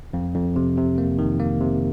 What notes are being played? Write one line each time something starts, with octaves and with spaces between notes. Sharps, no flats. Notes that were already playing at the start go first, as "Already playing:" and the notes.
F2
F2
C3
C3
A#3
D#3
A#3
C3